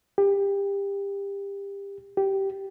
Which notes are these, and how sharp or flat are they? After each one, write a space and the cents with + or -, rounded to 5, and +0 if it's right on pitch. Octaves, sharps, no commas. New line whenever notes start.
G4 +25
G4 -10